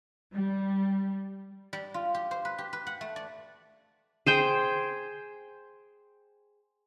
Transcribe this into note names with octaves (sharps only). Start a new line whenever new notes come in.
G3
G3
F4
G4
C5
B4
G4
B4
F#5
A3
D5
G#4 C5 G5